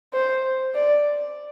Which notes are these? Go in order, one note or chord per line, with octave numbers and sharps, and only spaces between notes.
C5
D5